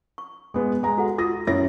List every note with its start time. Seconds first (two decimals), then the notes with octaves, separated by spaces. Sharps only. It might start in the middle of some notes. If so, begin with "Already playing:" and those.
0.18 C#6
0.54 G#3 B3
0.83 G#3 A#5
0.98 F#4 A4 F#5
1.18 F4 F#4 D#6 A#6
1.47 F#2 C#4 E4 C#5 A#6